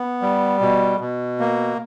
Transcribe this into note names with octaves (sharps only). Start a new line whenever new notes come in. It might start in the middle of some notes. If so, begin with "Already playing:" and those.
Already playing: B3
G3
B2
B2
A#3